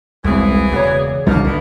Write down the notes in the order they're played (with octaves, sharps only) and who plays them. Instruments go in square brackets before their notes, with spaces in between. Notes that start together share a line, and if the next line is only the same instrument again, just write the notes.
[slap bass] E1 [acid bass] C2 [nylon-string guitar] C#3 G#3 C4 [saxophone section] E3 G#4
[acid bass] C#3 [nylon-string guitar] F#4 C#5 D5
[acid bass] C2 [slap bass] D3 D4 [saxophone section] A3 A#3
[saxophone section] B2 E3 B3 [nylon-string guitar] D#4